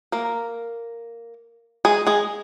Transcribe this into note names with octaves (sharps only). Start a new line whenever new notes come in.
A#3 A#4
G#3 G#4
G#3 G#4